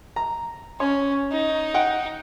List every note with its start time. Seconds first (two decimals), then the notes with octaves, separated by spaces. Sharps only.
0.16 A#5
0.80 C#4 C#5
1.32 D#4
1.74 F#5 G5